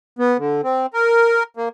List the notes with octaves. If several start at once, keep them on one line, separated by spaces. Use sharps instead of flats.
B3
D3
C4
A#4
A#3